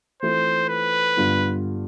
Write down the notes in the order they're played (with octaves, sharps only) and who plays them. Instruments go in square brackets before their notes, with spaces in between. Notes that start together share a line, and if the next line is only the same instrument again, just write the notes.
[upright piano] E3 A3 C4 F4 [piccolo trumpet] C5
[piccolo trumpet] B4
[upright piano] G2 D3 G3 B3 F4